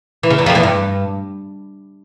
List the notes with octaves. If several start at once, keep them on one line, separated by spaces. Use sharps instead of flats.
E3
C#3
E2 E3
F2 F3
E2 E3
G2